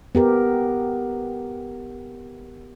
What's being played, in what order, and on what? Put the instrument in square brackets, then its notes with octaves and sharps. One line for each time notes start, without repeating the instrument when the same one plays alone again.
[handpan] B3 G4 A#4